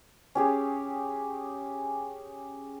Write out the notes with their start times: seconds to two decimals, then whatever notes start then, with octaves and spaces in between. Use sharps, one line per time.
0.35 C#4 G4 G#4